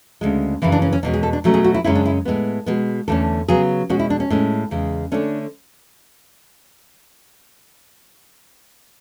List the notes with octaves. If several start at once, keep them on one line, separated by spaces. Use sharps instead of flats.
D2 C#3 G#3
F#2 C#3 E3 E4
D4
C#4
C#4
E2 B2 G#3 C#4 D4
G#4
A4
D4
B2 F#3 A3 C#4
G#4
F#4
E4
F#2 C#3 G#3 C#4 E4
D4
E4
A2 G#3 B3
B2 G#3 B3
E2 D3 A3 C#4 A4
C#3 F#3 B3 G#4
B2 G#3 C#4 F#4
E4
D4
C#4
A2 G#3 C#4
E2 C#3 G#3
D3 A3 C#4 D4